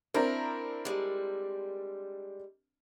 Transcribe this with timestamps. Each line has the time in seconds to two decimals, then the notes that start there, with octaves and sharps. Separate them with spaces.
0.14 C4 D4 E4 A#4
0.85 G3 G#3